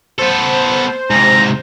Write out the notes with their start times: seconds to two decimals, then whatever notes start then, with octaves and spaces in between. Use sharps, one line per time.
0.19 B3 A4 C5
1.10 G#2 C3 A#5